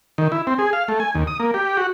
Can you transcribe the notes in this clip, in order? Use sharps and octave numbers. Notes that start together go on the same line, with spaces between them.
D#3
E4
C4
G#4
F5
A3
G#5
D#2
D#6
A#3
G4
F#4